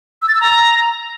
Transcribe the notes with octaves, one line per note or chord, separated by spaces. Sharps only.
E6
A6
E6
A#5